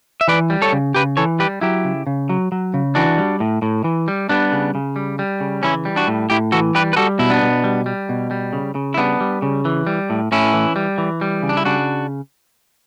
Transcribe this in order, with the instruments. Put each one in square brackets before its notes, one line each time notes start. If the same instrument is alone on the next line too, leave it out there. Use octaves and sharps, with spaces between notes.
[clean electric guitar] E5
E3 B4 D5
G3
A4 C#5
C#3
C#3 G4 B4
E3 A4 C#5
G3 G4 B4
F#3 E4 G4
C#3
C#3
F#3
F#3
C#3
E3 D4 F#4
G3
A2
A2
E3
G3
G3 B3 D4
C#3
C#3
G3
G3
C#3
E3 C#4 E4
G3
D4 F#4
A2
A2 E4 G4
E3 F#4 A4
G3 G4 B4
B4
G3 F#4 A4
B2 E4
B3 D4
B2
G3
G3
B2
G3
C#3
C#3
E4
G3 B3 D4
G3
C#3
E3
G3
A2
A2 C#4 E4
E3
G3
E3
G3
C#3
D4
E4
C#3 D4 F#4